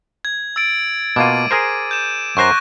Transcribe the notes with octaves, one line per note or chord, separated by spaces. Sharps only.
G#6
E6 A6 D7
B2 A#3 F4 D6 D#7
G#4 A#4 C5
G6 E7
F#2 C5 A#5 C#6 F#6 A#6